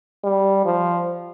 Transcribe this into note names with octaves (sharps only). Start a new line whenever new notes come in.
G3
F3